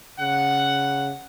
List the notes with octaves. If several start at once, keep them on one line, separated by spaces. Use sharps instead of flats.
C#3 F#5